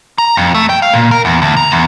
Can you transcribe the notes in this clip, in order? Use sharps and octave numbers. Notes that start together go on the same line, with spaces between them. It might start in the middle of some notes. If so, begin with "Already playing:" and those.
A#5
F2
A3
G5
F5
A#2
A#4
E2
D2
A#5
E2